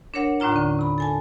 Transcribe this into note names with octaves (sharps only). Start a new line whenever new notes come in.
D4 A#4 C#5 F#5
D#2 A2 D4 F4 A#5
D3 C#4
C3 B5
A4 G#5 A5